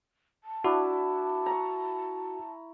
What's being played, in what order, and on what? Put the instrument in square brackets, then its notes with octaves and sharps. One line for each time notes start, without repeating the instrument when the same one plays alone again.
[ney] A5
[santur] D4 E4 [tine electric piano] F#4
[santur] A#5 C#6